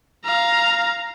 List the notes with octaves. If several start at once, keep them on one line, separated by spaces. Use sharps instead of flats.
F5 A#5